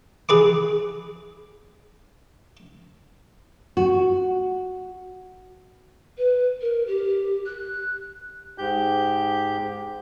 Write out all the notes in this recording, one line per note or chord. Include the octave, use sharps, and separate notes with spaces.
G#4 B4 D6
F#4
B4
A#4
G4
F#6
G#2 G4 G6